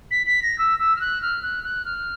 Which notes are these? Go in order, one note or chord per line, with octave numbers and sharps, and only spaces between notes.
B6
B6
A#6
E6
E6
F6
F#6
F6
F#6
F#6
F6